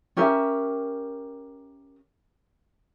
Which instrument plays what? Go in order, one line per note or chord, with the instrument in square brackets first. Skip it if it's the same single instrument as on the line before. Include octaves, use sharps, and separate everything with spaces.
[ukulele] C#4 G4 A#4 E5